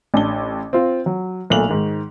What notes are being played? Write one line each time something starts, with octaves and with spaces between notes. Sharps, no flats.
A1 D4 A5 G7
C4 F4
F#3
B1 A#2 A3 F7 F#7
G#2 D#3